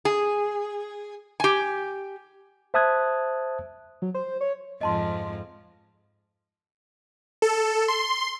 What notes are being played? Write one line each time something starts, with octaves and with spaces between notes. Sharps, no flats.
G#4
G4 G#5
C5 E5 A5 D#6 F#6 G#6
F#3
C5
C#5
F2 G#2 F3 D#5 A5 C6
A4
C6